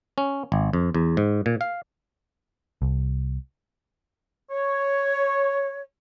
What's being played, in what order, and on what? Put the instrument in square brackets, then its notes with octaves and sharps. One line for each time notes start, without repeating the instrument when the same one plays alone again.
[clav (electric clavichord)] C#4
G#1
F2
E2
G#2
A#2
F5
[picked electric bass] C2
[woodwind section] C#5